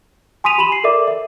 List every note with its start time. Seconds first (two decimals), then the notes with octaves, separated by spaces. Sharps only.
0.44 G#5 C6 D#6 B6 D#7 F7
0.58 G4 B5 D#7 E7 F#7
0.72 C7
0.84 A4 A#4 D5 E5 D6
1.07 E5